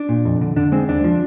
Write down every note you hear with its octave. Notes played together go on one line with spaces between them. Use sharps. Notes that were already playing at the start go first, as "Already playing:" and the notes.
Already playing: D4
A#2
F2
D3
D3 D4
G#3 C4
D#2 D4
F3